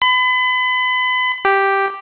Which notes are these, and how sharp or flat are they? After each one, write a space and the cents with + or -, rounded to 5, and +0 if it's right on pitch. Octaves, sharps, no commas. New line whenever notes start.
B5 +35
G4 +0